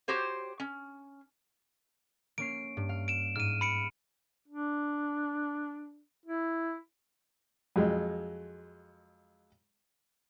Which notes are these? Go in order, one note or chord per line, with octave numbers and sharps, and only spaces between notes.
F#4 G4 C5 C#5
C#4
A#3 C#4 C7 D7
G2
F5
D7 E7
G#2 F6 D#7
B5 C#7 D7
D4
E4
F2 F#3 G#3